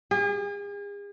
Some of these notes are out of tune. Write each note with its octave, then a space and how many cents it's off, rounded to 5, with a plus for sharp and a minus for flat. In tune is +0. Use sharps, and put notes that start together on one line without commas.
G#4 -40